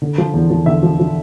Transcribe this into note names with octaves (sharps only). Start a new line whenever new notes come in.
D3
F3
E2
F3
D3 E5
F3
F3